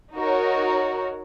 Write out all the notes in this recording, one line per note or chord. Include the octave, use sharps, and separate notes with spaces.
D#4 F#4 A#4 C#5